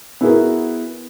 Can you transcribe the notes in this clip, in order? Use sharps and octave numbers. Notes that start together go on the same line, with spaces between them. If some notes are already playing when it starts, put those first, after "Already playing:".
B3 E4 F#4 G#4 A#4 B4